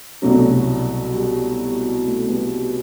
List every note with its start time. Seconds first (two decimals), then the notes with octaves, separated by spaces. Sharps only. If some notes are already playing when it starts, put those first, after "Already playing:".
0.22 C2 B2 F#3 A3
1.14 G3
2.06 A3
2.29 G3 B3